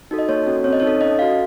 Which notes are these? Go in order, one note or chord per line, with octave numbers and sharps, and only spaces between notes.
D#4 F#4 A4
D#5
A#3 C#5
C#4 F#4 A4
C4 C#5
D#5
D#4 C#5
A4
C#4 D#5
F#4 A4 F5